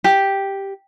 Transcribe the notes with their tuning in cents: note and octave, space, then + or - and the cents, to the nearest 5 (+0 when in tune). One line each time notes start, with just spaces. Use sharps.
G4 +0